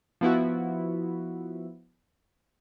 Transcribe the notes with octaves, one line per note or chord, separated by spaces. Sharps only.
F3 B3 E4 F#4